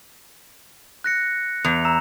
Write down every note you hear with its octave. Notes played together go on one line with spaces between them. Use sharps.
F#6 A#6 C#7
E2 F7
A#5 E6 E7